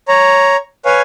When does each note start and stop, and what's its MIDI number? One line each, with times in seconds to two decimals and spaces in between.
0.08 0.56 73
0.08 0.56 82
0.85 1.02 71
0.85 1.02 73
0.85 1.02 77
0.85 1.02 80